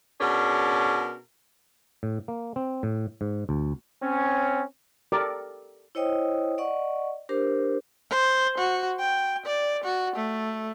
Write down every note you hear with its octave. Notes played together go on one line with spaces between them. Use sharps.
B2 C#4 D4 G#4 A#4
A2
A#3
C4
A2
G#2
D2
C4 C#4
G4 A4 A#4 D5
E4 C5 C#5 D#5 G5 D#6
D5 D#5 F#5 C#6
D4 G4 A#4 C5
C5
F#4
G5
D5
F#4
A3